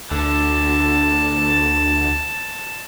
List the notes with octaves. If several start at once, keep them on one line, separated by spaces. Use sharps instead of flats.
D2 D3 A5